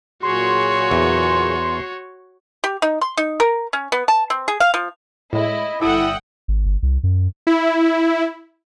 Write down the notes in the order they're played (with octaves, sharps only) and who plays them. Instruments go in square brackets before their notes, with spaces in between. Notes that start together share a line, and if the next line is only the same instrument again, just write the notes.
[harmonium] A#2 F#3 G#4 [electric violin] F#4 C#5 [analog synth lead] C6
[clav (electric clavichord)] E2
[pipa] G4
D#4
C6
D#4
A#4
C#4
B3
A5
C4
G#4
F5
F3
[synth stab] A2 G#3 [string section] E4 [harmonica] D#5
[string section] G1 F#5 G5 [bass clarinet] E4 [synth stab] A4 [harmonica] E5 D#6
[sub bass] G#1
G1
C2
F#2
[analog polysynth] E4